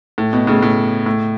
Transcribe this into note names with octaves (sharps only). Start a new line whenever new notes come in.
A2
B2
A2 C#3
A2
A2